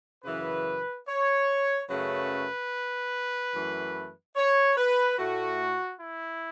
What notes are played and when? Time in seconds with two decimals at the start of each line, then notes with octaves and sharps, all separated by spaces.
0.24 F#2 C#3 E3 B4
1.07 C#5
1.89 F#2 C#3 F#3 A3 B4
3.53 F#2 E3 A3
4.36 C#5
4.76 B4
5.18 A2 A3 F#4
6.00 E4